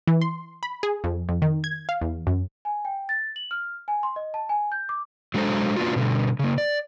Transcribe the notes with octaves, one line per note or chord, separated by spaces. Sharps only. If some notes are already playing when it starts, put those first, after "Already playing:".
E3
C6
B5
G#4
F2
F2
D#3
G#6
F5
E2
F#2
G#5
G5
A6
F#7
F6
G#5
C6
D#5
A5
G#5
G6
D6
F#3 G#3 D4 A4 C5 A#5
A#3 B3 D4 F4 F#4
B2 D3 G3
C#3 A#3
D5